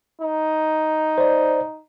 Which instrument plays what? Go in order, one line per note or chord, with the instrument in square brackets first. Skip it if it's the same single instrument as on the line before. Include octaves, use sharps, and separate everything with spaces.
[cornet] D#4
[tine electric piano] C5 D5